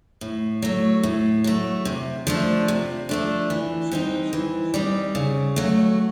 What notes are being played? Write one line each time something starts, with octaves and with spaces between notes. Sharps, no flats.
A2
F#3 A3
A2
F#3 A3
C3
F3 A3 D4
C3
F3 A3 D4
E3
G3 C4 D#4
E3
G3 C4 D#4
C#3
F#3 A3